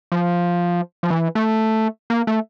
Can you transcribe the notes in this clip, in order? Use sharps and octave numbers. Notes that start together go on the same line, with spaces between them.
F3
F3
E3
A3
A#3
A3